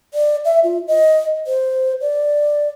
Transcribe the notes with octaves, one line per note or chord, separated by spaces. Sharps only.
D5
E5
F4
D#5
C5
D5